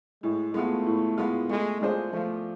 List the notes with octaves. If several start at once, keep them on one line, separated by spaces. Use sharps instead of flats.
A2 G#3
G#3 A3 B3 F4
A2
G#3 B3 F4
G#3 A3
G#3 D4 F4 G#4 C5
F3 A3